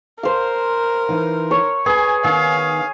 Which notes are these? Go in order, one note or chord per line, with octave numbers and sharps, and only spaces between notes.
A#4 C5 F5
E3 D#4 F5
C#5
G#4 B4 G#5
D#3 B3 D#4 G#4 F5